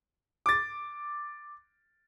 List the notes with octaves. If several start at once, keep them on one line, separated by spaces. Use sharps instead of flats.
D6 A6